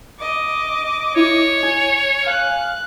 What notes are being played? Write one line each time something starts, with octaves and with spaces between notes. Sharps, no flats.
D#5 D6
E4 C#5
G#5
F5 F#6